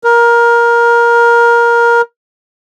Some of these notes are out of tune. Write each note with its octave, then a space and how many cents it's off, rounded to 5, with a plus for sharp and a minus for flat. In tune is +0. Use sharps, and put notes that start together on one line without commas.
A#4 +15